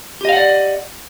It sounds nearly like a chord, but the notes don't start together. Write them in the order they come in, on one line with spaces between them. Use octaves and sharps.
G4 D#5 F5 F#5 D5